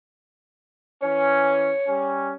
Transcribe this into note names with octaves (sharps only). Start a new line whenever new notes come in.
E3 C#4 C#5
G3 C#4